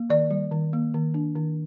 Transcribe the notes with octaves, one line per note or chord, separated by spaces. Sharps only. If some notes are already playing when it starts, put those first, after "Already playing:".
Already playing: A#3
D#3 D5
G3
D#3
A#3
D#3
D4
D#3